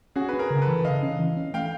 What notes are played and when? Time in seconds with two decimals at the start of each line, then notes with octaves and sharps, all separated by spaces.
0.16 C#4 F#4 G#4
0.29 C#4 B4
0.39 G#4 A#4
0.50 C#3
0.62 A4 B4
0.67 E3
0.85 C#3 D#5 F5
1.03 C#4
1.19 E3
1.37 C#4
1.54 A3 F5 G5